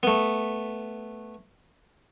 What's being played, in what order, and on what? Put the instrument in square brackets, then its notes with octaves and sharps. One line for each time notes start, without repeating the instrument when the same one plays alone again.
[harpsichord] A3 B3